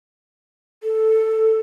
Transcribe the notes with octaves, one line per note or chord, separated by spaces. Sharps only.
A4